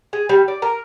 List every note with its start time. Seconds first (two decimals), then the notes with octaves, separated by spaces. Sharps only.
0.13 G#4
0.29 G3
0.48 D5
0.62 A#4